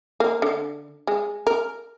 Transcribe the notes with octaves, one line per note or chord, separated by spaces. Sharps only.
A#3
D3
G#3
A#4